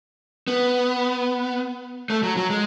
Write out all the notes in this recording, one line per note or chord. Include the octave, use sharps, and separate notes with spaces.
B3
A3
F#3
F#3
G#3